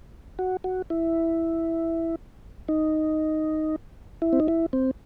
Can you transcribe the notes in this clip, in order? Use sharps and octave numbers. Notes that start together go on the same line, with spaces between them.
F#4
F#4
E4
D#4
E4
C4
D#4
E4
C4